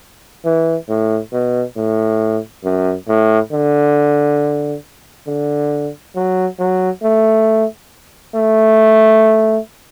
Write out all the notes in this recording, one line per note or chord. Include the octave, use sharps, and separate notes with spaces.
E3
A2
B2
A2
F#2
A2
D3
D3
F#3
F#3
A3
A3